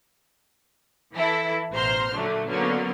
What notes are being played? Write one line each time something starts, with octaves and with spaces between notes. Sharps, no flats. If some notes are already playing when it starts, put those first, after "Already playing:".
E3 E4 A4
A1 B2 C5 A#5 C6 F6
A#2 D3 F#3 A3 D4
D3 F#3 A#3 B3 C#4